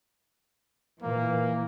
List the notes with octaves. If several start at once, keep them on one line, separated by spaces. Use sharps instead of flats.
A#2 E3 A#3